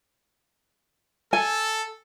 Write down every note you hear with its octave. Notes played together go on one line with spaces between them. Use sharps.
A4 G#5